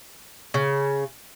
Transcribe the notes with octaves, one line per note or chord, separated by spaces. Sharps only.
C#3